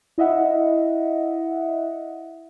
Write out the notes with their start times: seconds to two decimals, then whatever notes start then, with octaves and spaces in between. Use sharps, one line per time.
0.18 E4 D#5 E5 F#5